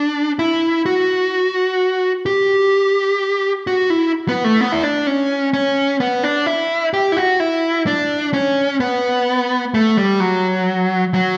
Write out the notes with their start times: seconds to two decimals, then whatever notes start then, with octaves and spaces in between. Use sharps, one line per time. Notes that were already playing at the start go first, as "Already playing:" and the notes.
Already playing: D4
0.39 E4
0.86 F#4
2.26 G4
3.67 F#4
3.90 E4
4.29 B3
4.44 A3
4.60 B3
4.72 E4
4.84 D4
5.07 C#4
5.53 C#4
6.00 B3
6.23 D4
6.46 E4
6.93 G4
7.12 E4
7.17 F#4
7.40 E4
7.87 D4
8.34 C#4
8.80 B3
9.74 A3
9.97 G3
10.20 F#3
11.14 F#3